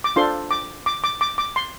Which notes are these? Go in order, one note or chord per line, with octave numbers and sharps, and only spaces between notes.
D6
D4 F4 A4 C5 C6
D6
D6
D6
D6
D6
C6